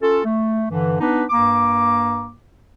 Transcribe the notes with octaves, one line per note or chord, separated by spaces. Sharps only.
C#4 F4 A4
A3
G2 D3 E3
B3 D4 D#4 B4
G2 A#3 D6